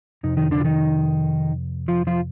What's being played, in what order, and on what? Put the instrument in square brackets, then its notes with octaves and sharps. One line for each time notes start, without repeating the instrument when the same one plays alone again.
[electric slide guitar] F2 C3 D#4
D#3 D#4
D3 D4
F4
D#3 D#4
F3 F4
F3 F4